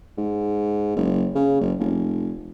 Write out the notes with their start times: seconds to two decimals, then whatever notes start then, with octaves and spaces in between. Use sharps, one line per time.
0.17 G#2
0.96 F#1
1.35 C#3
1.61 F#1
1.80 F1